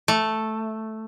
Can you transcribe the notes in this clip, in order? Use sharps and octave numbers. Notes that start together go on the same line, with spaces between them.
A3